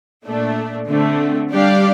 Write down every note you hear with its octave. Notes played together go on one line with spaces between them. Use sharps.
A#2 A3 D4
D3 A3 C4
G3 D4 G4 D5 F5